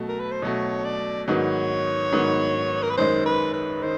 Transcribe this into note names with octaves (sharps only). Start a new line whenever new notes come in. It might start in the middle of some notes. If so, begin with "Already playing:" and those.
Already playing: B2 F#3 A3
A#4
B4
C5
B2 F#3 A3 C#5
D5
G#2 D#3 F#3 B3 C#5
G#2 D#3 F#3 B3
A#4
B4
F#2 D#3 G#3 C5
B4
B4
D#3 C5